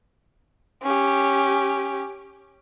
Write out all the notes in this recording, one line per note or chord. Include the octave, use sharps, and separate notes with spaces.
C#4 G4